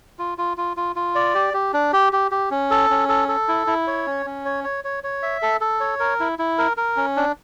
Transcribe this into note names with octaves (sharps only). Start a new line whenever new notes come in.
F4
F4
F4
F4
F4
D5
G4
G4
D4
G4
G4
G4
C#4
A4
C#4
A4
A4
E4
E4
C#5
C#4
C#4
C#5
C#5
C#5
C#5
E5
A4
A4
C#5
A#4
E4
E4
A#4
A#4
C#4
D4